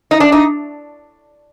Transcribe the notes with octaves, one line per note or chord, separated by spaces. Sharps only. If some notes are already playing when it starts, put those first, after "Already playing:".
D#4
D4
D#4